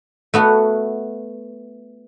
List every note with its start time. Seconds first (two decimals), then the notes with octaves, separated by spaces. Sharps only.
0.34 A3 B3 F#4